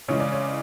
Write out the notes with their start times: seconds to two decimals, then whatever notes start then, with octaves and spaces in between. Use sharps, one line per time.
0.08 C#3 E3 G#3 C#5
0.20 D5
0.32 C#5